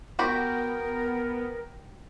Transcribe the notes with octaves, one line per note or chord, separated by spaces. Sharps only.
B3 F#4 G4 A#4 B5